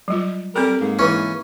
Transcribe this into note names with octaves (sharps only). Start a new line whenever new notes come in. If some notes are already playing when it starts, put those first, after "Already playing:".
F#3 G3 F4
G3 C4 A4 A#4
G#2 A#3
E3 C#4 E4